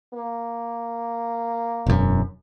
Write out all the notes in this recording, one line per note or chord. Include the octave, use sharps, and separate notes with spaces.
A#3
E1 F#2